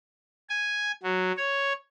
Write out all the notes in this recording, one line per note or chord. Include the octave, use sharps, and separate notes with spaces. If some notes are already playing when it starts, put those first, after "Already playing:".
G#5
F#3
C#5